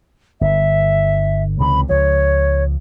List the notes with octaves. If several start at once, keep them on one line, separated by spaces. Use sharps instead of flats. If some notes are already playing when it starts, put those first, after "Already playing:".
G1 E5
C#2 C3 E3 B5
C#2 F3 C#5